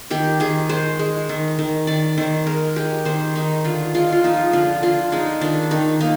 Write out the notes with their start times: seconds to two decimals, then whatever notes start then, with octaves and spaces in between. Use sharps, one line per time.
0.11 D#3 G4
0.40 D#3 G#4
0.69 G#3 C5
0.99 G#3
1.29 D#3
1.59 D#3
1.87 D#3 D5
2.18 D#3 C5
2.46 G#3 A#4
2.76 G#3 G4
3.05 D#3 C5
3.35 D#3 D#4
3.65 D3 F4
3.95 G#3 F4
4.12 F4
4.24 F3 D#4
4.53 D3 F4
4.83 D3 F4
5.12 G#3 D#4
5.41 D#3 D4
5.71 D#3 D#4
6.00 A#3 D#4